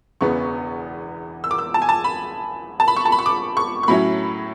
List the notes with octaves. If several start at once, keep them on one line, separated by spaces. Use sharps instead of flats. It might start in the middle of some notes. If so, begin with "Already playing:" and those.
E1 E2 C#3 E3 B3 C#6
E6
D6
E6
A5
G#5
A5
B5
A5
B5
C#6
A5
B5
C#6
D6
C#6
C#6
A2 F#3 C#4 E4 B5